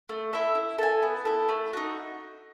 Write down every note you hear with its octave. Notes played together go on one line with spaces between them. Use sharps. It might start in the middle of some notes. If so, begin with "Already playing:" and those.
A3
E4 A4 E5
E4
A4 E5 G#5
B3
E4 A4
A3
D#4 F#4